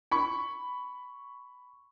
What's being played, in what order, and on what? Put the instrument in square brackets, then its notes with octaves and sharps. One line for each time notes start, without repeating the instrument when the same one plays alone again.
[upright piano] B5 C#6